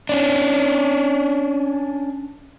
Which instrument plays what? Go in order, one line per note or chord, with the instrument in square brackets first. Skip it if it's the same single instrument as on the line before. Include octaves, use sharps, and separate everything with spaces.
[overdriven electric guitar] C#4 D4